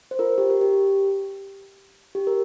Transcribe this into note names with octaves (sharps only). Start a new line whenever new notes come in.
C5
F4 A#4
G4
A#4
G4
G4
A#4